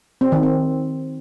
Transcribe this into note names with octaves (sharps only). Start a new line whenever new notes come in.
C4
D#3
C4